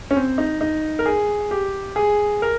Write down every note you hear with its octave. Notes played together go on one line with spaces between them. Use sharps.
C#4
C4
D#4
D#4
A#4
G#4
G4
G#4
A#4